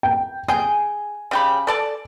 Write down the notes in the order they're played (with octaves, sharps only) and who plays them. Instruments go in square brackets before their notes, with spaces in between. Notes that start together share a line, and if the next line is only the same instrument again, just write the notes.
[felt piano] G5
[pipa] G#4 G5 [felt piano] G#5
[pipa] C#3 G4 B5
A4 D5 A5